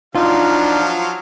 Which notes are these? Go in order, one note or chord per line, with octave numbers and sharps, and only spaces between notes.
F3 F#3 D4 D#4 F4 F5